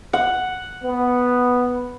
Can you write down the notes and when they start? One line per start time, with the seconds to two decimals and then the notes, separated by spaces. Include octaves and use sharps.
0.13 F#5
0.83 B3